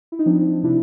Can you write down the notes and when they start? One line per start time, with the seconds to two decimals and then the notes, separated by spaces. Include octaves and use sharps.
0.12 E4
0.19 D#4
0.26 F3 C4 D4
0.63 C3 D4 E4